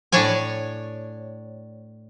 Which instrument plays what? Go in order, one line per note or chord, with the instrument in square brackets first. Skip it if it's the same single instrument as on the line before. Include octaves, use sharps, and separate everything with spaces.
[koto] A2 D4 C#5 D5 G#5